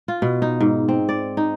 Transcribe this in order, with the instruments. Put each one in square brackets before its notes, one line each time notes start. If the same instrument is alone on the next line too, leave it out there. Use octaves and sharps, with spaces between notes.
[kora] F4
B2
D#4
G#2
C4
D5
D#4